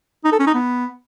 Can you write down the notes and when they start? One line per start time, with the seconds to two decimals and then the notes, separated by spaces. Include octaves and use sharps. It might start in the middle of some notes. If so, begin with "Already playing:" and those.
0.25 D#4
0.32 A4
0.39 C#4
0.47 D#4
0.54 B3